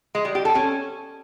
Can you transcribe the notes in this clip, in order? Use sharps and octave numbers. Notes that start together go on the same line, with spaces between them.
G#3
G3
G4
A4
C#4